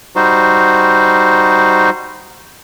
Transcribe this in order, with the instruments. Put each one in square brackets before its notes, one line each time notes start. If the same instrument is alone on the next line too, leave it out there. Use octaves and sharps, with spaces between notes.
[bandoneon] G3 D#4 F#4 C5